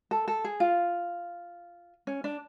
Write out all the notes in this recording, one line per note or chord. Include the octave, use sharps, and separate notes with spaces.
A4
A4
G#4
F4
C#4
D4